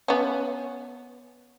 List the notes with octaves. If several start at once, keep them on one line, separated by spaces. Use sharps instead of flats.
B3 C#4